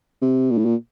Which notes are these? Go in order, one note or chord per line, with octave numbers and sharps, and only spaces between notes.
C3
A#2
A2
A#2